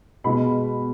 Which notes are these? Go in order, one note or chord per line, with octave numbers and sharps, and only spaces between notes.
B2 G#3 B5